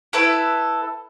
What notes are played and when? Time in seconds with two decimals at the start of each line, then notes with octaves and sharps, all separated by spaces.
0.13 E4 A4 B4